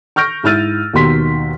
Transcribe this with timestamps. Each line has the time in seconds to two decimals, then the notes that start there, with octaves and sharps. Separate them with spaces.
0.16 C#6 F6 G6 A#6 D7
0.43 G#2 E4 E6 F6 A6 D#7
0.93 D#2 B2 D#3 C6 B6